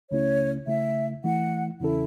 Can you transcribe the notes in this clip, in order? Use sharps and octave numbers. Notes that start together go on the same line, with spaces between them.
C#2 C#3 A3 C#4 E4 C#5
C#3 A3 E4 E5
E3 A3 E4 F#5
E2 C#3 E3 C#4 E4 A4